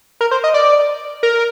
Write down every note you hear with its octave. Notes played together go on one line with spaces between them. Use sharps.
A#4
C5
D#5
D5
A#4